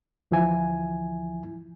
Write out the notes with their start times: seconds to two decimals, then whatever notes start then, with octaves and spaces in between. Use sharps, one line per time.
0.31 D2 E3 F3 E4 G#5